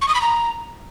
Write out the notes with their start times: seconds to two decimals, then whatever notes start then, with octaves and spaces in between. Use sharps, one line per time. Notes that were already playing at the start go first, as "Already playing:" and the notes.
0.02 C#6
0.08 D#6
0.15 B5
0.21 A#5